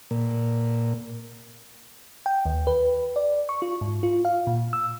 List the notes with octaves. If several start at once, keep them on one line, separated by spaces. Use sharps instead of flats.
A#2
G5
D#2
B4
D5
C#6
F4
G#2
F4
F5
A#2
E6